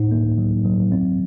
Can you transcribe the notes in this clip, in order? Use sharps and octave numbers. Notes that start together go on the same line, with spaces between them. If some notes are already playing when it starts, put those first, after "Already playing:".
Already playing: A2 D#4
A#3
F#3
F#3
C4